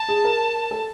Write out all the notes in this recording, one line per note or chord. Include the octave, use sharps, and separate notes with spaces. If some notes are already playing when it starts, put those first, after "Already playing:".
Already playing: A5
G#4
A#4
A4